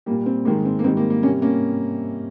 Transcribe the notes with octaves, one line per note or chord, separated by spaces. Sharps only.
A#2 G3 A#3
C4
G#2 D#3 G#3 A#3
C4
A#3
G#2 D#3 G3 C4
A#3
A#3
C3 G3 A#3 C#4
A#3 C#4